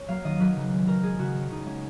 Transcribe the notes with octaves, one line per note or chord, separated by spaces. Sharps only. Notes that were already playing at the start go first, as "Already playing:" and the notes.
Already playing: C#5
F#3 A#3 F5
D#3 D#5
F#3 A#3 B4
C#3
G#3
C#3 A#4
G#3 G#4
C#3 F#4
G#3
C#3 D#4
G#3 C#4